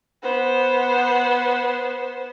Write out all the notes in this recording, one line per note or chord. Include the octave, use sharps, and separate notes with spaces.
B3 C5